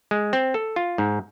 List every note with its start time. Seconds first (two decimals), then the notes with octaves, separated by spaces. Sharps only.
0.11 G#3
0.33 C4
0.54 A4
0.76 F4
0.98 G#2